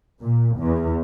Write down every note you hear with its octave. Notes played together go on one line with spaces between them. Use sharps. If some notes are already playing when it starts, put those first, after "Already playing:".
A#2
E2